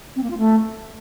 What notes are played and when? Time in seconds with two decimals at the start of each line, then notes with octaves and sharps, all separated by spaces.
0.16 C4
0.23 A#3
0.30 F4
0.38 A3